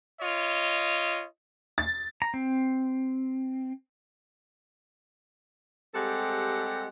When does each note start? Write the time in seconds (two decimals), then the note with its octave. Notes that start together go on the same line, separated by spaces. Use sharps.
0.21 F4 C#5 D#5
1.78 A6
2.22 A#5
2.34 C4
5.95 G3 G#3 C4 G4 A4 F#5